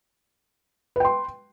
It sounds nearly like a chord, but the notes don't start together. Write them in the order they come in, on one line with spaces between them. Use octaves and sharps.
B4 G5 C6